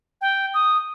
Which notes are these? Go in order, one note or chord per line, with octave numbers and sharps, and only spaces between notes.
G5
D#6